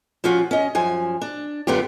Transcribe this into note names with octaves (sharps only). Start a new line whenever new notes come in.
F3 C#4 F4 F#4
C#4 D#5
F#2 F3 G#5
D4
F#2 D3 B3 F4 G4